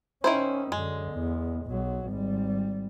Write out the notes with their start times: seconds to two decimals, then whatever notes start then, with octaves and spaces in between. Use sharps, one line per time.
0.24 D#3 C#4 E4 C5
0.72 F#2 D3 G#3
1.12 E2
1.66 B1 F#3
2.07 G#1 G3